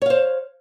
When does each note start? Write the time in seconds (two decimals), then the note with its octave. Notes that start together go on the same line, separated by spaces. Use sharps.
0.02 C#5
0.06 F5
0.10 C5